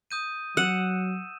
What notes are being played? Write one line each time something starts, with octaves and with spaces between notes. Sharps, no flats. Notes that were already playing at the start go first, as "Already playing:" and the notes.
D#6 G6 D#7
F#3 F#5 E6 D#7 E7